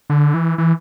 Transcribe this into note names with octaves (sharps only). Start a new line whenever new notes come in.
D3
E3
E3